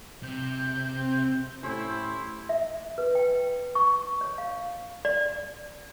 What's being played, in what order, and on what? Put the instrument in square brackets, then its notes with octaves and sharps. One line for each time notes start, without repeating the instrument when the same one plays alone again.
[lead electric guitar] C3 [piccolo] G6
[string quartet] C4
[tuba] A2 [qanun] C#4 G4 A4 [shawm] E4 [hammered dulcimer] C5
[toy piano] E5
B4
G5
C#6
C#5
F5
D5